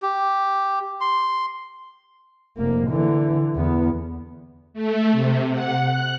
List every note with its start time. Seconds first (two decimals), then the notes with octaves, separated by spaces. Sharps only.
0.02 G4
1.01 C6
2.57 F1 A#3
2.89 D3 E3
3.56 E2 B3
4.73 A3
5.12 C3
5.51 F#5
5.83 F#6